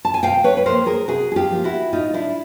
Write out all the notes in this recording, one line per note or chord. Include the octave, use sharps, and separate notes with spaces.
A5
G#5
C3 F5 G5
B4 C#5
B4
F3 A#3 A#4 C5
G#4 A#4
C3 F#4 G#4
G#4
F4 G4
F3 A#3
E4 F#4
A2 D#4 F4
D4 E4